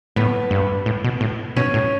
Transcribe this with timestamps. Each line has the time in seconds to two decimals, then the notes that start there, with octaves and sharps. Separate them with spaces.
0.16 A2 B3
0.51 G2
0.86 A2
1.04 B2
1.21 A2
1.56 B2 C#4
1.74 A2